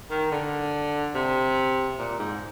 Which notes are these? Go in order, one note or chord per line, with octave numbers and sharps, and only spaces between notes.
D#3
D3
C3
A#2
G#2